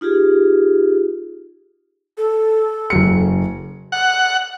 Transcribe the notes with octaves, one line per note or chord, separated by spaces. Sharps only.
D#4 F4 G4 G#4
A4
F#1 F#3 C#7
F#5